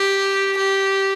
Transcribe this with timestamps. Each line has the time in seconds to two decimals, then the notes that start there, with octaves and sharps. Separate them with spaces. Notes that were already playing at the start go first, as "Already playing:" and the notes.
Already playing: G4
0.57 G4